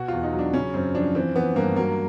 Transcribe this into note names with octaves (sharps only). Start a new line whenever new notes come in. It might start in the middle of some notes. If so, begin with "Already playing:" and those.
Already playing: B2 F#4
E2 F4
D#4
F#3
D4
C#3 C#4
F#2 C4
F3 D4
E3 C4
E3 B3
G2 A#3
F#3 A#3